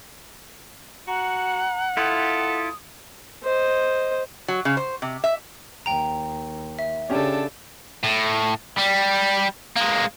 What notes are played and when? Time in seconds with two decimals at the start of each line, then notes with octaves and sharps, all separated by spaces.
1.08 F#4 F#5 A#5
1.97 E4 F4 A4 D#6
3.43 C5 D#5
4.48 F#3
4.65 C#3
4.77 C5
5.02 C3
5.24 E5
5.86 D#2 G5 A#5
6.79 E5
7.10 C#3 C#4 D4 G4 A4
8.04 A2
8.78 G3
9.76 G#3 A#3